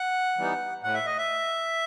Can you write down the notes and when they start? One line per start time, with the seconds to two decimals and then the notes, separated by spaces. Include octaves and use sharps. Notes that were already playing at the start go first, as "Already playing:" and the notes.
Already playing: F#5
0.37 E3 G3 B3 D#4
0.83 A2 F#5
0.94 E5
1.06 D#5
1.18 E5